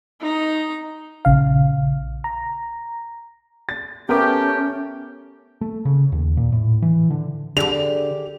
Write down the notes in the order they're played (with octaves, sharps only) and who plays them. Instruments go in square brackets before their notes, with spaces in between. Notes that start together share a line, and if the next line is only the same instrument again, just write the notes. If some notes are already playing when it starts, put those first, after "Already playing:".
[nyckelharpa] D#4 A#5
[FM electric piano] A#1 C#3 F5
A#5
[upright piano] A6
[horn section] A3 G4 [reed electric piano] B3 [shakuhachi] C#4 [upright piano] A#4 D6
[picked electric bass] A3
C#3
D#2
A#2
A2
E3
D3
[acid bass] D3 [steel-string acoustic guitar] G4 D5 [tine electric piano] G#4 [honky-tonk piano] F7